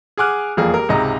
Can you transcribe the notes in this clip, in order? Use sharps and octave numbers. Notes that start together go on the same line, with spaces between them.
G#4 F#5 G#5 D6 F6 F#6
E1 F2 F3 A#3 G#4
G4 A#4
C#2 G#2 C3 D#5 A#5